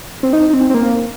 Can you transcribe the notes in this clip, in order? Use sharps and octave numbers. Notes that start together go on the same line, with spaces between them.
C4
D#4
D#4
C4
C4
A#3